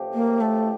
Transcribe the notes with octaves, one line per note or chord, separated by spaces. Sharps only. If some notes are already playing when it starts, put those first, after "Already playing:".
Already playing: A1 A2 F3 C4 G4
A#3
A3